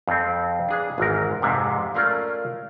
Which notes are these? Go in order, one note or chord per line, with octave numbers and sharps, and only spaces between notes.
F2 C4
D4 G#4 B4
G#1 E2 G#2 A#4
F2 G#2 C3
A3 C#4 F4 A#4 D5